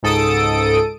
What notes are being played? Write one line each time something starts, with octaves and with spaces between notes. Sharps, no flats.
C#2 G#2 A4 D#6 D7